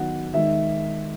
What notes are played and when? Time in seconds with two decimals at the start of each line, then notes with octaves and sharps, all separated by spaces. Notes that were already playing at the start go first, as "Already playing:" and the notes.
Already playing: D#3 F#3 B3 D#4 F#5
0.34 D#3 G#3 D#4 E5